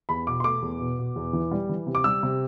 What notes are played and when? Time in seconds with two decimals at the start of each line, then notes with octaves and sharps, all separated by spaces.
0.09 E2 B5
0.27 B2 D6
0.40 C6
0.44 A3 D6
0.62 E2
0.80 B2
0.99 B2
1.16 E2
1.33 E3
1.51 G3
1.69 E3
1.86 C3
1.95 D6
2.04 G3 E6
2.23 C3